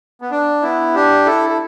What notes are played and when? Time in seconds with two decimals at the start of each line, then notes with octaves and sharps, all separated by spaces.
0.22 B3
0.31 D4
0.63 B3 E4
0.94 D4 G4
1.26 E4 A4
1.50 A4